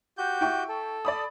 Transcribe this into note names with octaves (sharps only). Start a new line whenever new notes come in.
F#4 G4 G6
E4 G5 C#6
A4
D5 B5 D#6